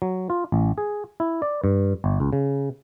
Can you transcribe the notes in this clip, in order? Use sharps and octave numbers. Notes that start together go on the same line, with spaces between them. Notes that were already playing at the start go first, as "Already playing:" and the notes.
F#3
F4
A1
G#4
E4
D5
G2
G1
C#2
C#3